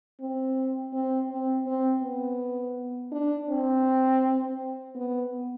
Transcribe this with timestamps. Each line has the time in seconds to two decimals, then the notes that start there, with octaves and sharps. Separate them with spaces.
0.20 C4
0.93 C4
1.30 C4
1.67 C4
2.03 B3
3.12 D4
3.49 C4
4.95 B3